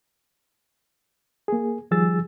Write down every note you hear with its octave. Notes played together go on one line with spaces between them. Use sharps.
A#3 G#4
D#3 F3 G3 G#4 E6 A6